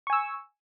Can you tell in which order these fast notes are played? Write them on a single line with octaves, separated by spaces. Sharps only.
C#6 G#5 E6